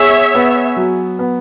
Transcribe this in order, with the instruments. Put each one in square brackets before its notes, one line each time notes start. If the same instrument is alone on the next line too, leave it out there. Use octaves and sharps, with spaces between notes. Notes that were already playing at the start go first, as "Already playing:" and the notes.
Already playing: [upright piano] B3 G#4 [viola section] C#5 E5
[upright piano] B3
F#3
B3